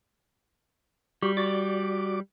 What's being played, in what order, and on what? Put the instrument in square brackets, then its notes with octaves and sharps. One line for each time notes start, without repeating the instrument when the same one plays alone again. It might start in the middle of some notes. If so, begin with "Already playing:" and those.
[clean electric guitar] G3 [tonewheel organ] F#4 G4
[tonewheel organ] F#4 D5 D6